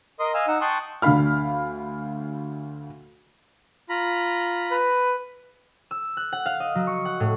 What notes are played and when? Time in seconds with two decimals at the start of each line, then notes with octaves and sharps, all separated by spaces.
0.20 A#4 D#5 C6 D#6
0.34 D#5 F5 G#5 E6 F6
0.47 D#4 F#5 E6
0.61 G5 A5 C6 C#6 D#6 F#6
1.02 D2 D3 D4 F5 B5 F6
3.89 F4 A#5 B5
4.71 B4
5.91 E6
6.17 F#6
6.32 F#5
6.46 F5
6.60 D#5
6.75 F#3
6.87 C#6
7.05 F#5
7.20 A2